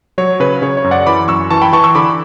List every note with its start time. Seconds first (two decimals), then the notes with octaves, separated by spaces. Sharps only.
0.18 F#3 C#5
0.40 C#3 B4
0.62 C#3 C#5
0.77 C#5
0.84 F#2
0.91 D5 F#5
1.06 E3 B5 D6
1.28 F#2 C#6 E6
1.51 E3 A5 C#6
1.62 G5 B5
1.73 E3 A5 C#6
1.84 C#6 E6
1.95 D3 B5 D6